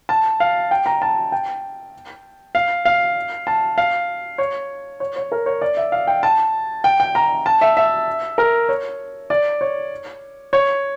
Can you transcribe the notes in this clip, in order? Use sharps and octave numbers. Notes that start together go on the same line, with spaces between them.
A5
F5
G5
A#5
A5
G5
F5
F5
A5
F5
C#5
C#5
C#5
A#4
C#5
D5
E5
F5
G5
A5
G5
G5
A#5
A5
E5
E5
A#4
C#5
D5
C#5
C#5